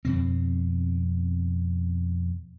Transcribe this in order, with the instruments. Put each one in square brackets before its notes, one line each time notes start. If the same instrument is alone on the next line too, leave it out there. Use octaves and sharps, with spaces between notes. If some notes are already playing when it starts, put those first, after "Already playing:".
[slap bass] F2 B2 C4